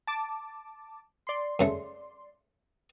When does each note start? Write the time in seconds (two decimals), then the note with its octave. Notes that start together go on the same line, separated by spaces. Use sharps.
0.07 A5 D6
1.27 D5 C6
1.59 F#2 C#3 A3